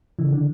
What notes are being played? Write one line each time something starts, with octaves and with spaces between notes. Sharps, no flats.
C#3 E3
D3